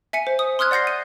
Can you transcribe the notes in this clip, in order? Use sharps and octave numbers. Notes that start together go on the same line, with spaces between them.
E5 G#5 C#7 D#7
C5
D#6
C6 D#6 F6 F#6 G#6
D5 F#5 G6 A#6 C7
D#7